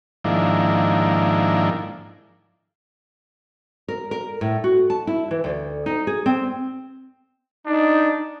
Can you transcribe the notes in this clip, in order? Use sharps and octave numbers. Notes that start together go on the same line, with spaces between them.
G#2 D#3 F3 A#3 D4 E4
A#4
A#4
A2
F#4
A5
E4
E3
D2
D#4
G#4
C4
D4 D#4